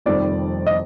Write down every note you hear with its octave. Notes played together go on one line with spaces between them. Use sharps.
F1 F2 D#3 G3 D5
D#5